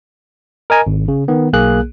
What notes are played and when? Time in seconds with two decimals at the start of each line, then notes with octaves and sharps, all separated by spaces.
0.70 A#4 D#5 G#5 A#5
0.87 G#1
1.08 C#3
1.28 D#3 B3
1.53 B1 A#3 G#4 F#6